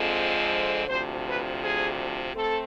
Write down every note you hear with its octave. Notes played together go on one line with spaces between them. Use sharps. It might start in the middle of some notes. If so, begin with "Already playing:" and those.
Already playing: F2 D3 F3 G#3 C4
D2 C3 F3 C5
B4
G#4
A3 C4 A4